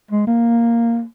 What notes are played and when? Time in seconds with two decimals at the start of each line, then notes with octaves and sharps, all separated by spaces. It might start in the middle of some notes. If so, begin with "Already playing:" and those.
0.11 G#3
0.27 A#3